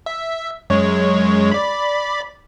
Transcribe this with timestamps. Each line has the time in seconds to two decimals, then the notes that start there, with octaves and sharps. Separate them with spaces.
0.06 E5
0.70 F#2 G#3 C#5
1.51 D5 B5